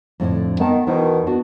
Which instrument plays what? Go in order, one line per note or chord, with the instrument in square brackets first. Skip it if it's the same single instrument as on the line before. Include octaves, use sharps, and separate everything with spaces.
[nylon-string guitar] F2 A2 D3
[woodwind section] D#3 [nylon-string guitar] B3 F#5 A5
[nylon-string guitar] E2 E4 C5 [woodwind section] B2 D#3
[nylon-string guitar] B3 D4 F#4